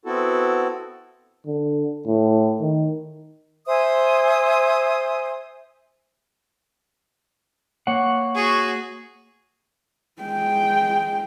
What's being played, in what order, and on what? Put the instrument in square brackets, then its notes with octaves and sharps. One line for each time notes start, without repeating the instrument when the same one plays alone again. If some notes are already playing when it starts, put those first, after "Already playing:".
[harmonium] B3 C4 E4 F#4 A4
[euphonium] D3
A2
D#3
[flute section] C5 E5 G#5 D#6
[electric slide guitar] A#3 C#5 F#5
[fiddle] F#4 G#4
[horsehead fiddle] G#3 G5